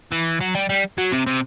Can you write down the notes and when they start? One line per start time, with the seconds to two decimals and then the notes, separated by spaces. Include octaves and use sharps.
0.12 E3
0.41 F#3
0.55 G3
0.69 G3
0.98 F#3
1.12 C3
1.27 C3